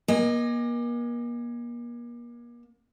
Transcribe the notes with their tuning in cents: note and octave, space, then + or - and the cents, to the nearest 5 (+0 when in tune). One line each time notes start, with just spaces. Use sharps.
A#3 +40 D#5 +0 G#5 -25